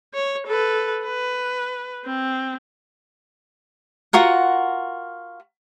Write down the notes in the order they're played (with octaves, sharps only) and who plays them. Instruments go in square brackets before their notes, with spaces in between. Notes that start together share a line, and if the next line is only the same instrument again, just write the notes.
[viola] C#5
A4 B4
B4
C4
[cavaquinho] F4 F#4 A#4 F#5